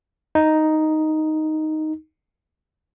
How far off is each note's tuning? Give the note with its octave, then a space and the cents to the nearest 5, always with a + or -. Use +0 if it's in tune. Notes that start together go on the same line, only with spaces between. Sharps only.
D#4 +0